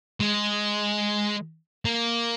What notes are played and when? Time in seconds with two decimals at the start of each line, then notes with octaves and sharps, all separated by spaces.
0.20 G#3
1.85 A#3